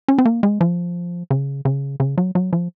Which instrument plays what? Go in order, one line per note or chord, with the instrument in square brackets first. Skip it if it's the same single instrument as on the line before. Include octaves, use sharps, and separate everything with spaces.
[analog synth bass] C#4
C4
A#3
G#3
F3
C#3
C#3
C#3
F#3
F#3
F3